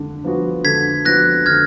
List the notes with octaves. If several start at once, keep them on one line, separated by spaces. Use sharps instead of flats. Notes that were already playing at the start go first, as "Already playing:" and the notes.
Already playing: D3 D4
F3 B3 D4 F#4
D3 G#6 B6
F3 B3 D4 F#4 F#6 A#6
D3 F6 G#6